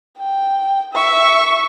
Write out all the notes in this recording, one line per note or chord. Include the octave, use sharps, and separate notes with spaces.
G5
E5 C#6